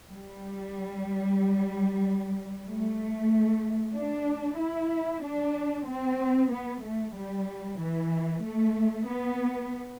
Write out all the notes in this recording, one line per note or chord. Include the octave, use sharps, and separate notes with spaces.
G3
A3
D4
E4
D4
C4
B3
A3
G3
E3
A3
B3